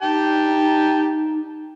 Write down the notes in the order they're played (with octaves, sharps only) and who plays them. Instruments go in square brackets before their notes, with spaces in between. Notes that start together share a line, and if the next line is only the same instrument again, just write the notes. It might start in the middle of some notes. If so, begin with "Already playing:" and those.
[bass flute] D#4 [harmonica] G4 G5 A5